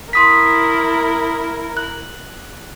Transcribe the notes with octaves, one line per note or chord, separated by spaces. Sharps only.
E4 A#4 C6 D#6 B6
F#6